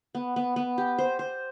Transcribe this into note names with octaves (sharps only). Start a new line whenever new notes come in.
B3
B3
B3
G4
C5
C5